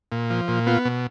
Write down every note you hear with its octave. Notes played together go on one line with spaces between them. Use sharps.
A#2
F3
A#2
B3 F4
B2